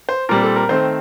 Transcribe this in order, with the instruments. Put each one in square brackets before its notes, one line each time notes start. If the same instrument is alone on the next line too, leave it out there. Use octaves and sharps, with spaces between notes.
[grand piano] C5
A#2 G3 C4 A#4
A4
A#4
D#3 A3 C4 C5